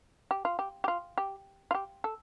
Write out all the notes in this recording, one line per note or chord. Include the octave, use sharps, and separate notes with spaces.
G4
F4
G4
G4
F4
G4
F4
G4
A4